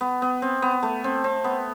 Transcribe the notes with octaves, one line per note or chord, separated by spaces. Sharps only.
B3
B3
C4
B3
A3
C4
C4
B3